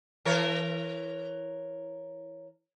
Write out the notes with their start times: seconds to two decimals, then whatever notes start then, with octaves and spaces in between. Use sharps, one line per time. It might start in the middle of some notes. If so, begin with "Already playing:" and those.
0.25 E3 A#4 C#5